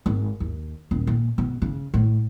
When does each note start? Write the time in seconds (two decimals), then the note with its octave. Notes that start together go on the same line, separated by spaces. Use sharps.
0.06 G#1
0.40 D#2
0.91 D#1
1.07 A#2
1.38 B2
1.62 C#3
1.94 A2